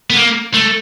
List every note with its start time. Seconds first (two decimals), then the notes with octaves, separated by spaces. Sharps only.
0.10 B3
0.17 A#3
0.54 A3